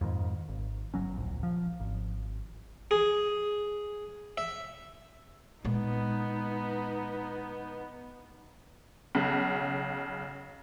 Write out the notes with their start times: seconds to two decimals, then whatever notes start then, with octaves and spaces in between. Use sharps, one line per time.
0.01 F2 G#2 D#3
0.48 G#1
0.94 G1 F#3 C#4
1.16 D1 A#1
1.43 F3
1.80 G#1
2.91 G#4
4.38 E5
5.65 A#2 G#3 B3 D#4
9.15 B1 C#3